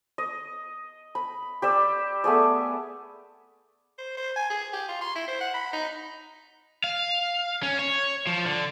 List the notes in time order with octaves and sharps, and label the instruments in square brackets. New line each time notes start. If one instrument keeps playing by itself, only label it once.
[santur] D#5
B5
G4 D5 E6
A3 B3 G#4 D5
[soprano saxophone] C5
C5
G#5
G#4
G4
F4
C6
E4
C5
F#5
B5
D#4
[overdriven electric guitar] F5
C#4
C#5
F3
D3